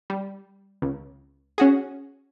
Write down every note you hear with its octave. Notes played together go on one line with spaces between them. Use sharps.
G3
C#2
C#4 F#4 G#4